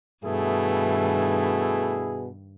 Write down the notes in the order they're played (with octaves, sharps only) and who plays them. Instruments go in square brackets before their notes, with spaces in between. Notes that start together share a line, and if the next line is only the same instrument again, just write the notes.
[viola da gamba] G2 D#3 [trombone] B2 [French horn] A3 [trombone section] E4 G#4